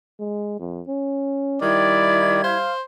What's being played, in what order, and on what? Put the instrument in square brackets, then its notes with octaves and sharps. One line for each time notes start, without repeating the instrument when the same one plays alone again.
[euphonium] G#3
F2
C#4
[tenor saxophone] D#3 [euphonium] G3 [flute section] E4 G#6 [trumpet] D5
[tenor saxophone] C5 [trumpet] F5